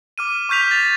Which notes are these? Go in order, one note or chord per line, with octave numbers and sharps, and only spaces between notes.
D6 F6 D#7
C#6 F6 G6 B6 F7
A6 F7